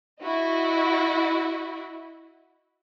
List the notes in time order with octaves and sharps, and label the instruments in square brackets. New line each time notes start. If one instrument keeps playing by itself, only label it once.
[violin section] E4 F#4 D#5